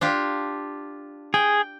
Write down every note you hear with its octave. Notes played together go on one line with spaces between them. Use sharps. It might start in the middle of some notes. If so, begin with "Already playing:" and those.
D4 F4 G4
G#4 G5